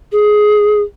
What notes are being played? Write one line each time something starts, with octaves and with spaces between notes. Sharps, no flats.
G#4